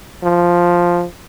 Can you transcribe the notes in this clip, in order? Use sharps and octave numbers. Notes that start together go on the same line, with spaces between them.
F3